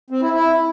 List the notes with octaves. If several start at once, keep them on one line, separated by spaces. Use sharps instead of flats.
C4
E4
E4